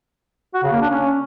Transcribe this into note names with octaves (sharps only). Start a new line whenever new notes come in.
F#4
C#3
A#3
D4
C#4